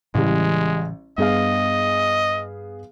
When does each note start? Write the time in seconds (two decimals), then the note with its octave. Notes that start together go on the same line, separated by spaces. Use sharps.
0.15 A1 A2 C#3 E3 G3 G#3
1.18 G2 B3 G#4 D#5 F5